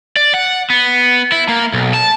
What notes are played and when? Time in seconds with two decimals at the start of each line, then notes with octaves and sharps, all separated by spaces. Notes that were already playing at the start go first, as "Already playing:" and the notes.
0.16 D5
0.34 F#5
0.70 B3
1.32 E4
1.48 A#3
1.74 B1
1.94 A5